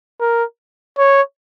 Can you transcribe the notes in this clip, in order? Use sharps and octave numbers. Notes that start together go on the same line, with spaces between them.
A#4
C#5